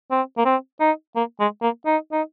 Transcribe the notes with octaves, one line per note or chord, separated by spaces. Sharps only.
C4
A#3
C4
D#4
A#3
G#3
A#3
D#4
D#4